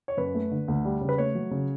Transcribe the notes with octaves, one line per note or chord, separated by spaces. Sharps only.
C#5
F#2 B4
A3
D3
D2
G3
C#3
B4
A3 C#5
F#3
C#3